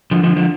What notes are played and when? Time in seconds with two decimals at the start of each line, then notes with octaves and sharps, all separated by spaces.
0.11 D3 F3
0.23 D3 F3
0.36 D3 F3